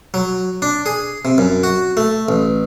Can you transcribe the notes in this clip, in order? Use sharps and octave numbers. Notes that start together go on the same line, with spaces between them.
F#3
D4
G#4
C3
F#2
F#4
A3
A1